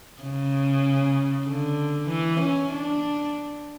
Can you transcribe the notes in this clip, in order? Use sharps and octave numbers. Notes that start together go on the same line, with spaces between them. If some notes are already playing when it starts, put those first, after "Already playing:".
C#3
D3
E3
C#4
D4